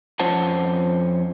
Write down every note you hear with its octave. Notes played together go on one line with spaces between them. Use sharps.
F2 C#4 F4 C5 F#5 A5